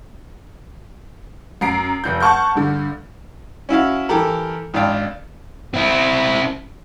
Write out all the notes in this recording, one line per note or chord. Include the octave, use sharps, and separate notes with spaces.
F#2 A#5 C7 D7
F1 G6
F#5 A5 C#6 F6 G6
G2 D3
C#4 E4 F#4 F5
E3 G4 A4 A#4
G#1 D4 F5 G5
C4 E4